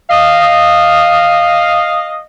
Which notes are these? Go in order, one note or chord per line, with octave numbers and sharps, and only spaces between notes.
D#5 F5